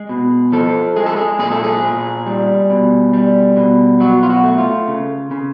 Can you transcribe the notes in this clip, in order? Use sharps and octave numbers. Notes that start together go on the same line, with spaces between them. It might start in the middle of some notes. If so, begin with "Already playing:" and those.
Already playing: G#3 G#4
B2
F3 A4
G#3 G#4
A4
G#4
A#2 G#4
A4
G#4
A#2
G3
B2
G3
B2
F#3 F#4
F4
F#4
A3
F4
C#3
C#3